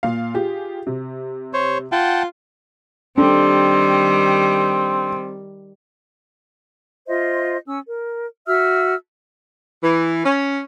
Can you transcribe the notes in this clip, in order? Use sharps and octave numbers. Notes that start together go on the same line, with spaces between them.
A#2 F5
F4 G4 G#4
C3
C5 C#5
F4 F#5 G5 A5
D#3 G3 C4 D4 A4
F4 C5 D#5 E5
C#4 E6
A#4
F#4 E5 E6 F6
E3
C#4